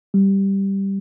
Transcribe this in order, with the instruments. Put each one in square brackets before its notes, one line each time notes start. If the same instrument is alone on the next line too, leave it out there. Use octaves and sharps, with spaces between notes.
[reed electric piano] G3